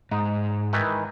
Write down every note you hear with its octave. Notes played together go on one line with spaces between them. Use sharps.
G#2 D#4
D#3 E3 B4